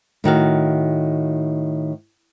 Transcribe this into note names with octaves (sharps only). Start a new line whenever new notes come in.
A2 D#3 F#4 F5